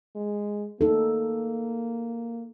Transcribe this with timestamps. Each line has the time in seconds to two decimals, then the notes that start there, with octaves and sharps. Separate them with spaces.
0.15 G#3
0.81 A#3 D#4 A4